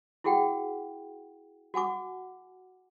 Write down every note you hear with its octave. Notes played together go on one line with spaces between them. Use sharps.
E4 F#4 G#4 F#5 G5
F#4 F#5 G#5 D6